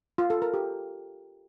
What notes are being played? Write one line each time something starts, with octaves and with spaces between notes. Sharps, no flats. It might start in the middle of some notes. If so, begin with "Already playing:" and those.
F4
A4
A#4
G4